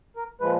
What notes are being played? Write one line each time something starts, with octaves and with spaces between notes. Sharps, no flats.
A#4
A#2 F3 G#3 B4